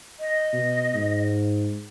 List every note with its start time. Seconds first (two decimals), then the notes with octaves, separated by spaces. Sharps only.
0.20 D#5
0.53 B2
0.94 G#2